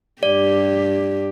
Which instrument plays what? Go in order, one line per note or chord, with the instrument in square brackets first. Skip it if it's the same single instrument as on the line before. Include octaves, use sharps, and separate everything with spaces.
[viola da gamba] G2 G4 [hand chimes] D5